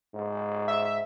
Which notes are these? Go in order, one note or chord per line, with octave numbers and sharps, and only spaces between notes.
G#2
E5